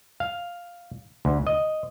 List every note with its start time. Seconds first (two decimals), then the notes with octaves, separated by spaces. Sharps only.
0.20 F5
1.25 D2
1.47 D#5